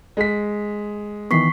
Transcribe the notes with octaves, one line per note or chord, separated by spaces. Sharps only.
G#3 B6
D#3 E3 B3 C#6 B6 C7